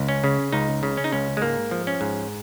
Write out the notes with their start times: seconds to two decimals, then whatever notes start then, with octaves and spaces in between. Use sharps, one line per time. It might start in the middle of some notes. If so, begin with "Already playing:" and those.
Already playing: C#2
0.09 C#4
0.24 C#3
0.53 C#2 D#4
0.83 C#3
0.97 C#4
1.04 D#4
1.12 C#2 C#4
1.37 G#3
1.42 G#2 A#3
1.71 F3
1.87 C#4
2.01 G#2